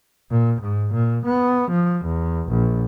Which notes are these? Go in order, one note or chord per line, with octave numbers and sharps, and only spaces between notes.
A#2
G#2
A#2
B3
F3
E2
A#1